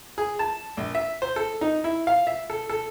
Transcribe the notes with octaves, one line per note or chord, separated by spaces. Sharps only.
G#4
A5
A#1
E5
C5
A4
D#4
E4
F5
E5
A4
A4